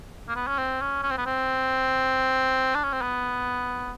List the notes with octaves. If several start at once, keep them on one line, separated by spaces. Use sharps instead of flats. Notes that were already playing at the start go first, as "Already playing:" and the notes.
A#3
B3
C#4
C4
C#4
C#4
C4
B3
C4
D4
C#4
C4
B3